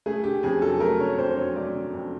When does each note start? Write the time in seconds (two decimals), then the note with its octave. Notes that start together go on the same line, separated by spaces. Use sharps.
0.06 A3 G#4
0.24 D3 G4
0.43 F2 G#4
0.61 F#3 A4
0.80 A3 A#4
0.99 D3 C#5
1.18 F2 C5
1.37 F#3 C#5
1.56 A3 D5
1.74 D3
1.94 F2